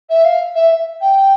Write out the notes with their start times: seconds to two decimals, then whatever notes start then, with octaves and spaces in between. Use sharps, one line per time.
0.09 E5
0.24 F5
0.55 E5
1.01 G5